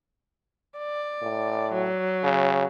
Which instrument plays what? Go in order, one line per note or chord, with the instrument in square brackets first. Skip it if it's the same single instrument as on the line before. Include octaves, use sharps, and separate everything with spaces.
[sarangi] D5
[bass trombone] A2
[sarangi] F#3
[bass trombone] C#3